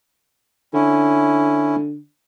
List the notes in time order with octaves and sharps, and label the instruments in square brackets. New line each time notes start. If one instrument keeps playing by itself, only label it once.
[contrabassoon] D3 [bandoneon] C#4 E4